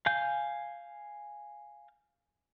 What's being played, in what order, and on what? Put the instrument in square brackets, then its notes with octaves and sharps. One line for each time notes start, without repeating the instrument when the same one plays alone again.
[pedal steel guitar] F5 G#5 G6